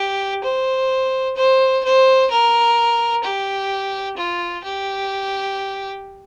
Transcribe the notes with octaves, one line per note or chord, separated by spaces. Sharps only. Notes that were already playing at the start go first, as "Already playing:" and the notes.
Already playing: G4
C5
C5
C5
A#4
G4
F4
G4